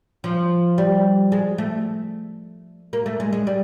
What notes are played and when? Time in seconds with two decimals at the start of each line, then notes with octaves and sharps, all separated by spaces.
0.24 F3
0.78 G3
1.32 G#3
1.58 A3
2.93 A#3
3.06 A3
3.20 G#3
3.33 G#3
3.47 G3